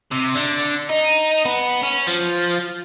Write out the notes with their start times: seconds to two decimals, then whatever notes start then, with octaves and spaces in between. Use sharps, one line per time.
0.12 C3
0.35 D3
0.90 D#4
1.45 B3
1.83 C#4
2.07 F3